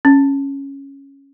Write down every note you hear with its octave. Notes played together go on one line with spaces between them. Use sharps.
C#4